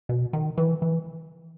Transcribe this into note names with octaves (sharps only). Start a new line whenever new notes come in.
B2
D#3
E3
E3